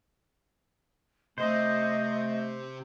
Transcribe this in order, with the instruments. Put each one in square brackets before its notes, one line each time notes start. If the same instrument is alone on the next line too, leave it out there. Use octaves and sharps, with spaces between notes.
[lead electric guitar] C3 C4 [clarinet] A3 [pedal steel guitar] C5 [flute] D#5